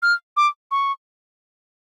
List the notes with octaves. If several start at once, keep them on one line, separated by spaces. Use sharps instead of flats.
F6
D6
C#6